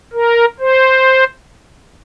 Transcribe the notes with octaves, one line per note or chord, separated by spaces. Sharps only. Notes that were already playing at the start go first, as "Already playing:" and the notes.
A#4
C5